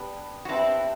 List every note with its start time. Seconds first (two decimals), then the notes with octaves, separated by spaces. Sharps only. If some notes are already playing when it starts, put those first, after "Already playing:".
Already playing: B3 D4 G4
0.45 F#4
0.49 B3 C4 D4 E4 G4